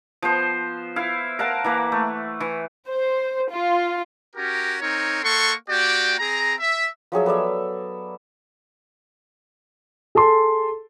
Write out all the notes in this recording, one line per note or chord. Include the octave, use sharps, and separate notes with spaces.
F3 B3 C5
E4 F5
A#4 F5 F#5 A5
E3 A#3 B4
A3
E3
C5
F4
C#4 F#4 G4 A#4
C4 D#4 A#4 C#5
A#3 A4 F#5 C6 C#6
A#3 F#4 G4 D5 G5
C4 G#4 A#5
E5
F3 F#3 G#4 E5
B3 A4 D5 E5
G#4 A4 A5 C6